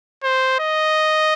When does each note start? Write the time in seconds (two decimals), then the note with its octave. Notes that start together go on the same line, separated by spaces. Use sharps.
0.23 C5
0.60 D#5